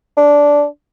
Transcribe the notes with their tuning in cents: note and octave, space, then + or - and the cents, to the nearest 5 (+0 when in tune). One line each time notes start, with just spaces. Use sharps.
D4 -10